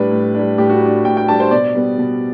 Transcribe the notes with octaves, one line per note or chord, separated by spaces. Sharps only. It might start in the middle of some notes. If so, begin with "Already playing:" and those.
Already playing: A2 G3 D4 B4
A2
G3 D4
A2 G4
F#4
G3 D4
A2 G5
G5
G3 D4 A5
C5
B2 D5
G3 B3
B2